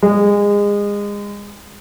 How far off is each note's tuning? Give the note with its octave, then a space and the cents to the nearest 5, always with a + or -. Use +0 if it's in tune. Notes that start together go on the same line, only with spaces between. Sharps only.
G#3 -25